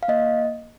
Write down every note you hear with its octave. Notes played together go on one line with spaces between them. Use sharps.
F5
A#3 D#5